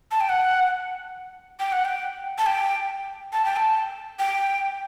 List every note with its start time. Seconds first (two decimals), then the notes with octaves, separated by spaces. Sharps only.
0.11 A5
0.20 G5
0.29 F#5
1.60 G5
1.72 F#5
1.85 G5
2.38 A5
2.46 G5
3.33 A5
3.45 G5
3.56 A5
4.19 G5